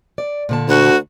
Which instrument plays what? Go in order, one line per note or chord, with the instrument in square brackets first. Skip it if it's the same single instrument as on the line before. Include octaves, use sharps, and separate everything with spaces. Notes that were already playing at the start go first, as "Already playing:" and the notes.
[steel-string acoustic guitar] D5
A#2 D3 A5
[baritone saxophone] D2 [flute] F#4